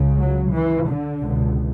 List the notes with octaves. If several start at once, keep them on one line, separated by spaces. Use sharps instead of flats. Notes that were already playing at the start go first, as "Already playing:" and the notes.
Already playing: C#2 C#3
F#3
E3
D3
C#2 B2